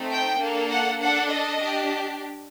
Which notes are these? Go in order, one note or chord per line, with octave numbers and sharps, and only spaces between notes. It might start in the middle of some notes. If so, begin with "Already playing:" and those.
Already playing: A3 C4 D#4
G5
A#3 D4 A4
F#5
D4 A4 F#5
D#5
D4 G4